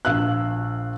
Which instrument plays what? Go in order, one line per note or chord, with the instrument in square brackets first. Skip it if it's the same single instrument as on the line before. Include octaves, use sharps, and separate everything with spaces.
[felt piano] A#1 F5 E6 F#6